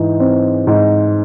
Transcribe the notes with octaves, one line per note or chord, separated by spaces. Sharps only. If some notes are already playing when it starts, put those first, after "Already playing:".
Already playing: G#2 E3
C4
G#2